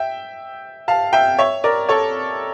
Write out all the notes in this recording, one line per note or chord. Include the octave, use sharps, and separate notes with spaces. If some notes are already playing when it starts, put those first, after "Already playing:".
Already playing: E5 G5
F5 A5
E5 G5
C#5 E5
A#4 D5
A4 C#5